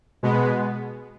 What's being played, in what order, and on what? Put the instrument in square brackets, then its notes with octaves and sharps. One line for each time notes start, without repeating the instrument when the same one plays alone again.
[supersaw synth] B2 G#3 B3